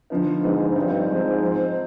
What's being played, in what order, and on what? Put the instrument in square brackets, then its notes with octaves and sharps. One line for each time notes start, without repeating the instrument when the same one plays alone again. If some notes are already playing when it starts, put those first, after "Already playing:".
[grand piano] D3 F3 B3 D#4
[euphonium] G#2 [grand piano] D3 F3 B3 D#4
[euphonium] G2 [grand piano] F3 C4 D#4
[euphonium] G#2 [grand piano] F3 C4 D#4
[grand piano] F3 C4 D#4